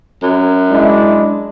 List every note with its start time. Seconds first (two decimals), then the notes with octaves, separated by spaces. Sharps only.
0.23 F#2
0.71 G#3 D4 E4